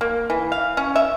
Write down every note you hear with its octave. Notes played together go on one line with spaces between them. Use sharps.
A#3
E3
F5
C#4
E5